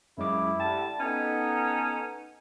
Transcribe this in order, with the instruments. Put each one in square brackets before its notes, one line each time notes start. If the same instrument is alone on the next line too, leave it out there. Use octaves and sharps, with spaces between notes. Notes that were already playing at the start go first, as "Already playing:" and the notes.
[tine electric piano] F#2 G#3 D6 [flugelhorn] E4
[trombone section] D3 G3 [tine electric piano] G5 [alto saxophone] A5
[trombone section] B3 A4 [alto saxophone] C#4 [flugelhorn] D#4